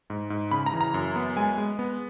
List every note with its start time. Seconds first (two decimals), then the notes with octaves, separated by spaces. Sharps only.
0.10 G#2
0.30 G#2
0.51 C#3 B5
0.66 A#5
0.73 E3
0.81 A#5
0.94 F#2
1.16 B3
1.36 G#3 G#5
1.58 G#3
1.79 B3